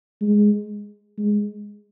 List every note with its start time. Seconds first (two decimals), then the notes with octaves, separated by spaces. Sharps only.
0.21 G#3
1.18 G#3